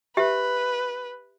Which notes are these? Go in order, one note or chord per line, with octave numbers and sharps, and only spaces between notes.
G4 B4 E5